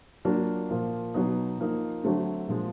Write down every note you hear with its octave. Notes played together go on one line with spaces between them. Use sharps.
F#3 A#3 D4 F4
A#2 F3 A#3
B2 F#3 B3 D#4
F3 A#3 D#4
D3 F#3 A3 C4
A#2 F3 G#3